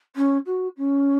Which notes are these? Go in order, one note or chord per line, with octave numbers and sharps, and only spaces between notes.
C#4
F#4
C#4